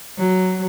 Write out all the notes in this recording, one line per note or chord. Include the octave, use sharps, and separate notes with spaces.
F#3